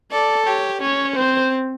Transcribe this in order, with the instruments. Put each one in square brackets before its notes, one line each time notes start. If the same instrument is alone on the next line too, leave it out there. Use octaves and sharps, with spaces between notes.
[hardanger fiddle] A4 [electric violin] D5
[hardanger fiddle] G4 [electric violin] C#5
[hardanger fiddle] C#4 [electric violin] C#5
[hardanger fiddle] C4 [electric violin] C5